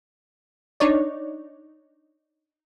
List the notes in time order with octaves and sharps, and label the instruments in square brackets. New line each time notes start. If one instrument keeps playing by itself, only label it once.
[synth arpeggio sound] D4 D#4 C#5 D5